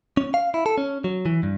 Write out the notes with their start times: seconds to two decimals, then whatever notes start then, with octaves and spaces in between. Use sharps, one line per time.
0.17 C#4
0.34 F5
0.54 E4
0.66 A4
0.78 C#4
1.04 F#3
1.26 E3
1.43 G2